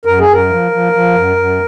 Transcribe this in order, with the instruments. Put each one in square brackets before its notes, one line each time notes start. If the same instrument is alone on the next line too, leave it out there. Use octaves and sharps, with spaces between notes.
[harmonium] F#2 A#4
G#4
F#2
A#4
F3
F3
F3
F#2
F#2